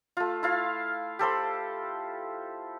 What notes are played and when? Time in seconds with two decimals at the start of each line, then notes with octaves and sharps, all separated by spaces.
0.17 A3 F4
0.43 E4 F4 F5
1.19 G4 A4 C5 B5